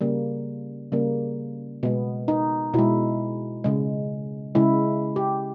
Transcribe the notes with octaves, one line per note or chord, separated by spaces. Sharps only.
C#3 G3 A#3
C#3 G3 A#3
B2 G#3 B3
D#4
B2 G#3 E4
C#3 G#3
C#3 G#3 E4
G4